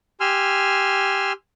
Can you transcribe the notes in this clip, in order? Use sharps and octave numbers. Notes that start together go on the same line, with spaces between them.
G4 G#5 C6 E6 F6